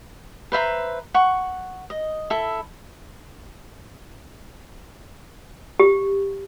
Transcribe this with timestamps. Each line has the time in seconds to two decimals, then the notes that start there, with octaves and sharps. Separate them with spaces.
0.52 B4 C5 E5 A#5
1.14 F#5 C#6
1.90 D#5
2.30 E4 A4 E5
5.80 G4